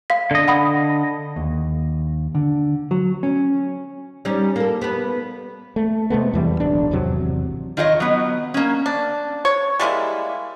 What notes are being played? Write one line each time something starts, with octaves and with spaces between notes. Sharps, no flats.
F5 B6
D3 D#5
F#5 B5 D#6
D#2
D3
F#3
C#4
G3 C#4 D#4
A#3 A4
B3 B4
A3
C3 G#3 A3 B3
E2 E3 G3
D1 B1 D4
G#1 E2 C3 F#3
D#3 F4 C#5 D#5
F#3 B3
A#3 C#4
D4
C#5
G3 G#3 A#3 E4